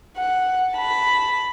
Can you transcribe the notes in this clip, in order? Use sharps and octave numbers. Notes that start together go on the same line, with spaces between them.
F#5
A5 B5